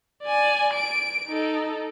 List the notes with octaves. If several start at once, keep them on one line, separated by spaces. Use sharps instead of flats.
D5 G#5
D7
D#4 A4